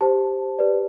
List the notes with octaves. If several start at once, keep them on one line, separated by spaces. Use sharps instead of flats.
G4 C5 A5
G4 B4 D5